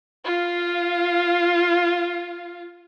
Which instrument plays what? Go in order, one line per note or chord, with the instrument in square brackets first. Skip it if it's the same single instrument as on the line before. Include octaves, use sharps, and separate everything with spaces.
[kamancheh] F4 F5